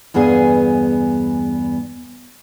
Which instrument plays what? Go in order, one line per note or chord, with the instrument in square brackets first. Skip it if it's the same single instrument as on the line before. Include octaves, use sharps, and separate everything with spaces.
[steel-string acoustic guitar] E2 G2 B3 G#4 F5 G#5